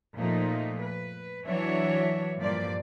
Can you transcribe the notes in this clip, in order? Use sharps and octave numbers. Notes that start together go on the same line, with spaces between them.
A#2 F3 A3 D#4
B4
E3 F#3 D4 C#5 E5
G2 A#2 F3 A#3 D5